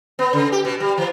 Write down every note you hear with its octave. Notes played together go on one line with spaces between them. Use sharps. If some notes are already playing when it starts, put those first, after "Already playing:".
B3
C#3
G4
B2
G3
E3